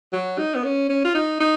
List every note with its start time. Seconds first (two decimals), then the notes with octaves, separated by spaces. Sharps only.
0.13 F#3
0.38 D#4
0.55 B3
0.64 C#4
0.89 C#4
1.05 F4
1.15 D#4
1.40 D#4